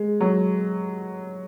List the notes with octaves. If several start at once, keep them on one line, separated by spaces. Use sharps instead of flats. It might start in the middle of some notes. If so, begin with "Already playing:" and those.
Already playing: G#3
F#3